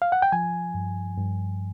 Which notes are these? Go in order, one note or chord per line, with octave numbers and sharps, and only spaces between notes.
F5
F#5
G5
F3 G#5
G2
G2